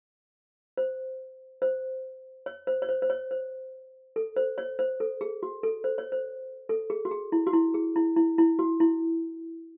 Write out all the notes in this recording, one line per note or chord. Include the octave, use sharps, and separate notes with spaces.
C5
C5
C#5
C5
C#5
C5
C5
C#5
C5
A4
C5
C#5
C5
A4
G#4
F#4
A4
C5
C#5
C5
A4
G#4
F#4
G#4
E4
F#4
E4
G#4
E4
E4
E4
F#4
E4